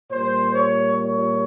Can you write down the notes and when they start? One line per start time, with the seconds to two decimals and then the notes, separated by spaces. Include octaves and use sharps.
0.10 A#2 G3 C5
0.54 C#5
0.97 C#5